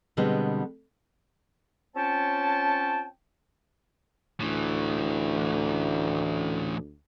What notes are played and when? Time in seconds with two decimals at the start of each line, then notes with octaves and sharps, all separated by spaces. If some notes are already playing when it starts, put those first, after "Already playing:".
0.17 B2 D3 G3 G#3 B3 C4
1.96 C4 C#4 F4 C#5 G5 A5
4.40 D2 A2 E3